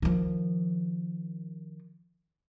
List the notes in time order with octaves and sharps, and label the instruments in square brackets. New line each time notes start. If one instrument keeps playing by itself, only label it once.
[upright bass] D#3 F3